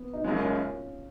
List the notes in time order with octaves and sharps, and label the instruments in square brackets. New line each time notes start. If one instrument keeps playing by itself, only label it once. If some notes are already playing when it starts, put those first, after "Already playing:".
Already playing: [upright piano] B3
D#4
[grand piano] F#1 F#2 C#3 G#3 [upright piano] C#4 F4
[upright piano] C#4 F4